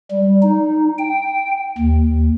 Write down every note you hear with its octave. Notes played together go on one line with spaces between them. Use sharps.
G3
D#4
G5
D#2